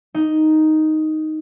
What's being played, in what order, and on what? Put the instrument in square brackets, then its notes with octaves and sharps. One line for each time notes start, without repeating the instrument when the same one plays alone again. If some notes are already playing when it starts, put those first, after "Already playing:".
[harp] D#4